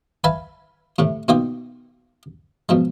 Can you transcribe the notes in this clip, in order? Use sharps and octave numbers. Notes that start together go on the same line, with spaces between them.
B4 E5 F5 G#5 A5 B5
A2 C3 A3
B2 A#3 D#4 F4 G5 D6
B2 F3 G#3